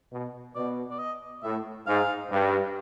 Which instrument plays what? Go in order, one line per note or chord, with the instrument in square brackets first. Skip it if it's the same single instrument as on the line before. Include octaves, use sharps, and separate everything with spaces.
[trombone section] B2
[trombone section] B2 [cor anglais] D5
[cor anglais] D5
D#5
[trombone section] A2 [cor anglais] E5
[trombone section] G#2 [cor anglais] F5
[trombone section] G2